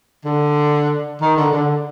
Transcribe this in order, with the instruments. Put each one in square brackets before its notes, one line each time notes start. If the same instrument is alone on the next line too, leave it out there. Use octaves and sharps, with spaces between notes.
[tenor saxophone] D3
D#3
D3
D3